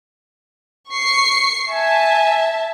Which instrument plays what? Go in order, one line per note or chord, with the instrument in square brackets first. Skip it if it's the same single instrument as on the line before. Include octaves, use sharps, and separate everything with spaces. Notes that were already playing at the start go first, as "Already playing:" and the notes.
[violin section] C#6 C7 C#7
[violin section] E5 A5 [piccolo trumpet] G#5